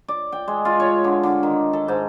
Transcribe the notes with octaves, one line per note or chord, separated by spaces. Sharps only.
D5
G5
G#3
F4
C#5
D3
D3
D#3
A4
G#2